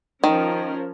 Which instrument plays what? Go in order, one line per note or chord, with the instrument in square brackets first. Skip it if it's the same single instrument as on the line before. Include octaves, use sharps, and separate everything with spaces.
[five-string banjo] D#3 [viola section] F3 C#4 A#4